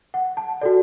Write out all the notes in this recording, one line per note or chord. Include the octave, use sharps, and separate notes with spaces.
F#5
A5
F#4 A4 D5